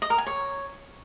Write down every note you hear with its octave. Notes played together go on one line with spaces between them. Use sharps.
D#5
A#4
G#5
C#5